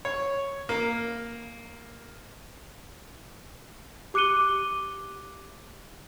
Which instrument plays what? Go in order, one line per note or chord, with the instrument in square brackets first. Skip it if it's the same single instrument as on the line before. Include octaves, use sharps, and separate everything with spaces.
[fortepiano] C#5
A#3
[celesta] G4 D6 F#6 C#7 D#7 G7